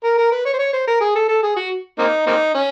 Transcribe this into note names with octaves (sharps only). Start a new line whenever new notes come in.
A#4
A#4
B4
C#5
C5
C#5
C5
A#4
G#4
A4
A4
G#4
F#4
A#3 C4 D#4
A#3 C4 D#4
C#4